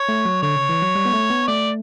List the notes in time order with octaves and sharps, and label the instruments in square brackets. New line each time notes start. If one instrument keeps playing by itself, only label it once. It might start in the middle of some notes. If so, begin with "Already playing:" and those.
Already playing: [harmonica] C#5
[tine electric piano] A3
F#3
[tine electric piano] D3 [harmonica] C#5
[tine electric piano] C#3
E3
F#3
G3
B3
A3
B3
[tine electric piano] A3 [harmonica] D5